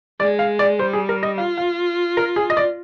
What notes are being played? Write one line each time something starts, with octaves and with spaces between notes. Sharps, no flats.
G#3 D5
F5
D5
G3 C5
G#4
A#4
D#5
F4 F5
F5
A#4
G#4
D#5
D5